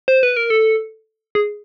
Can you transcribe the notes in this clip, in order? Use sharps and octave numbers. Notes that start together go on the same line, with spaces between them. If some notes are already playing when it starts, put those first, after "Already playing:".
C5
B4
A#4
A4
G#4